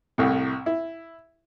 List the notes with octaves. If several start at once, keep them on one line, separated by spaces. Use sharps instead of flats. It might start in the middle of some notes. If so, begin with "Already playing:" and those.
C2 A2 C3
E4